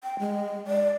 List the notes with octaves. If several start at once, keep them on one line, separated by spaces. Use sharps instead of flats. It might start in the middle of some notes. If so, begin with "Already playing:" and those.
G5
G#3
D5